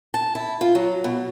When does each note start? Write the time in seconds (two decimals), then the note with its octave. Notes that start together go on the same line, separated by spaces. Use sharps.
0.14 A5
0.35 E4
0.61 F4
0.75 F#3
1.04 B2